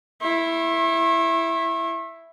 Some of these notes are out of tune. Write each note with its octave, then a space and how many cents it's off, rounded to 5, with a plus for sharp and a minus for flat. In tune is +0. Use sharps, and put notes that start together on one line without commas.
E4 +5 C#6 -45